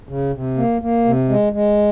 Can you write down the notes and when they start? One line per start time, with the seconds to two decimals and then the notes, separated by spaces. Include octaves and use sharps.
0.09 C#3
0.33 C3
0.57 A#3
0.81 A#3
1.05 C3
1.29 G#3
1.53 G#3